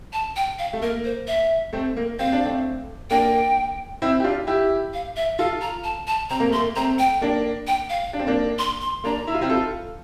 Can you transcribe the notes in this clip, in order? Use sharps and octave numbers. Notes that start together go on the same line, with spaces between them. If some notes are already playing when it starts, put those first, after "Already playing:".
A5
G5
F5
A3
A#3 A#4
C5
E5
A3 C4
A#3
C4 F5
D4
A3 C4
A#3 D4 G5
C4 E4
G4
D4 F4
E4 G4
F5
E5
F4 A4 F5
A#5
A5
A5
C4 A#5
A#3
A3 C6
A#3
A3 C4 A#5
G5
A#3 D4
G5
F5
D4
C4
A#3 D4
C6
C6
A#3 D4 A#5
E4
F4
C4 E4
F4 A4